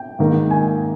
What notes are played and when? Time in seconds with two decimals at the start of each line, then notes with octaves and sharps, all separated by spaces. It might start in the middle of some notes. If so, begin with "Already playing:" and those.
Already playing: G5
0.19 G#2 D#3 A#3
0.51 G#5